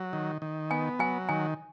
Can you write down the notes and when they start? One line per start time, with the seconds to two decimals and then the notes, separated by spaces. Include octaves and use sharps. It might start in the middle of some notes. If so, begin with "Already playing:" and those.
Already playing: F#3
0.13 D#3
0.42 D#3
0.71 B3 G#5
0.99 F#3 G#5
1.29 D#3 G#5